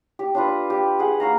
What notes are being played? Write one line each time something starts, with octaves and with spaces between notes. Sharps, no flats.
G4
D4 F4 B4
G4
G#4 F#5
A#3 F#4 F5 A#5